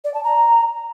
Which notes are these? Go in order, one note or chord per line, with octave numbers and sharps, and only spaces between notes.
D5
A5
A#5